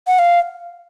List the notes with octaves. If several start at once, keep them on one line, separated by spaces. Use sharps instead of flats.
F#5
F5